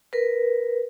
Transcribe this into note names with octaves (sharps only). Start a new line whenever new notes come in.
A#4 B4